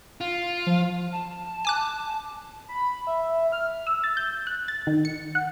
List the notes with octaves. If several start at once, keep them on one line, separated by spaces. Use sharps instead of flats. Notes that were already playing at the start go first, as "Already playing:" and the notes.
F4
F3
A5
G#5 D6 F#6
B5
E5
F6
E6
A6
G6
F#6
A6
D#3
C#7
F#5